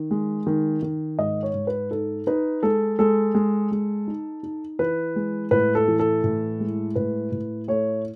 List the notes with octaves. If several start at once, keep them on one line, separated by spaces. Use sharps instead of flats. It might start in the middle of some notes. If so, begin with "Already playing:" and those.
Already playing: D#3
G#3
D#3
D#3
G#2 D#5
C#5
G#2
B4
D#4 A4
D#4 B4
G#3 A4
G#3 A4
G#3
G#3
D#4
D#4
E3 B4
G#3
A2 B4
A4
E3
A4
A2
G#3
A2 B4
A2
A3 C#5